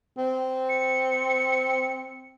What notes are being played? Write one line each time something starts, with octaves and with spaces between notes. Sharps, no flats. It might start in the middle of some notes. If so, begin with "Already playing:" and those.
C4
C#7